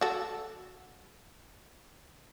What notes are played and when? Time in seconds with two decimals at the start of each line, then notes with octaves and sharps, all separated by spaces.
0.01 F#4 A4